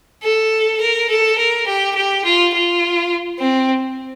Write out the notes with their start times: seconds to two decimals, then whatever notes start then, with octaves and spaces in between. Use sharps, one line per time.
0.23 A4
0.81 A#4
1.09 A4
1.38 A#4
1.67 G4
1.95 G4
2.24 F4
2.54 F4
3.39 C4